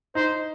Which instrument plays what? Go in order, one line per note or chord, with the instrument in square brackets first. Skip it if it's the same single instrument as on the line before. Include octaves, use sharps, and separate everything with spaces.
[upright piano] D#4 [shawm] C5